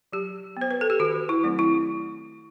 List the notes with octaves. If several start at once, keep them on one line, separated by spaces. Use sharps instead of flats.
F#3 G4
B3 C5
B4
A4
G4
D#3 F#4
E4
F#3 A3 C4
E4